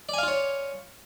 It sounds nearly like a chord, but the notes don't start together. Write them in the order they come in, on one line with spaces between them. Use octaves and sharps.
D5 G#5 F5 F4 C#5